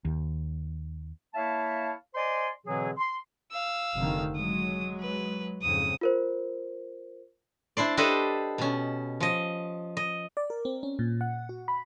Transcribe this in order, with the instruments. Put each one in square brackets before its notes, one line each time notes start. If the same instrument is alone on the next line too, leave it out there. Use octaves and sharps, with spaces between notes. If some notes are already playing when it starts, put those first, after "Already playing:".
[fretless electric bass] D#2
[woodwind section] A#3 E4 C#5 E5 F5 A5
C5 D5 D#5 G#5 C6
B2 D3 E3 F#3 C4 G#4
C6
[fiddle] F5 E6
[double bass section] F1 D3 D#3
[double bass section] F#3 G#3 [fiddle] D#6
[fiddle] B4
[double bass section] F2 G#2 C#3 [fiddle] D#6
[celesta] F4 A#4 C5
[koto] D4 E4 C5 D5
D4 G4 A4 B4 C5 D#5
B2 C#4
F3 D#5
D#5
[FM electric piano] D5
A#4
C4
C#4
A#2
F#5
F#4
B5